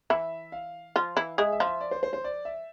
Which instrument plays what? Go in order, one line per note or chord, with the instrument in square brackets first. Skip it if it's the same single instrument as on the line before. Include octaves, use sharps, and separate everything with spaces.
[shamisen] E3 E4 [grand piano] E5
[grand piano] F5
[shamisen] F3 F4
E3 E4
[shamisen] G#3 G#4 [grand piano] E5
[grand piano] E5
[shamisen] F3 F4
[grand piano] E5
D5
C5
C5
C5
D5
E5